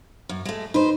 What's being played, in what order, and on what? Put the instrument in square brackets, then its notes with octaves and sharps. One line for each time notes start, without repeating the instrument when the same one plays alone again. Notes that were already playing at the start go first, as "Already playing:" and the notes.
[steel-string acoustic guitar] F#2
G#3 A3
[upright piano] D#4 [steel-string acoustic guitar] B4 C5